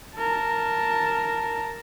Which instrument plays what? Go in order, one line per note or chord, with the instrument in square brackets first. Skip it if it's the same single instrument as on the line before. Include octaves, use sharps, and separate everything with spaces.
[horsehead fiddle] A#4 A5